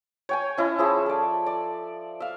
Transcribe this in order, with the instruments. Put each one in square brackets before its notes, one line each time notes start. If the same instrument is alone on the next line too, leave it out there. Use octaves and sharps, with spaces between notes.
[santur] C#5 G5 G#5
C#4 E4 D#5
F3 G#4 E5
A4 D5
D5
E5 F5